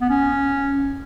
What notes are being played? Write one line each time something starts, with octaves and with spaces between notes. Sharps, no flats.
B3
C#4